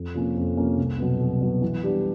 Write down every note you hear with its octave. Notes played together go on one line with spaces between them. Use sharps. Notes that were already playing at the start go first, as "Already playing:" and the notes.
Already playing: F2
C3 F3 A#3 C#4
F2
C3 F3 A#3 C#4
C2
B2 F#3 B3
C2
B2 F#3 B3
E3
G3 B3 D4 G4